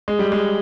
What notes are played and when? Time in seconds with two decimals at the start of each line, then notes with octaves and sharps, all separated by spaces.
0.08 G#3
0.19 G3
0.32 G#3